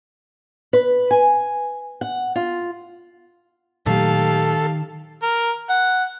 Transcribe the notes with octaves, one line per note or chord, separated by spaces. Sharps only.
B4
G#5
F#5
F4
A#2 D#3 F#3 A3 G4 A4 F5
A#4
F#5